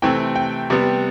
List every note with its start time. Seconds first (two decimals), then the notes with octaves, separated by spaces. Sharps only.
0.02 C3 E3 A3 C4 G5
0.36 G5
0.70 C3 G3 B3